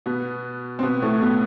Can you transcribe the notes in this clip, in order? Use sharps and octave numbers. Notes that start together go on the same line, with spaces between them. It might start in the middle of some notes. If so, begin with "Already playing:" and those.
B2 B3
C4
B2 B3
A2 A3
B2 B3